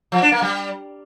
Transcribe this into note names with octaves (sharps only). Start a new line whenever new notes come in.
F3
D4
A#3
G3